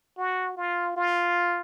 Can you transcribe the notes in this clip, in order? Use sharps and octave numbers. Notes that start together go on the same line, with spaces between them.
F#4
F4
F4